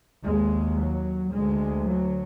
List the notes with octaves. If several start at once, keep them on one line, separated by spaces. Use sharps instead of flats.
D#2 G#3
F#3
D2 G#3
F#3